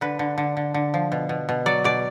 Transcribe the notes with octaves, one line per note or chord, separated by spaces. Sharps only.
D3 B4
D3
D3
D3
D3
F3
B2
B2
B2
F#3 D5
B2 D5